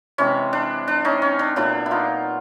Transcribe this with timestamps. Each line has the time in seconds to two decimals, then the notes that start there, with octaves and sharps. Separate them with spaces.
0.18 C3 E3 G#3 C#4
0.53 D4
0.88 D4
1.05 C#4 D#4
1.22 C#4
1.39 D4
1.56 A#2 F#3 B3 D4 E4
1.86 E4
1.91 D#4 F4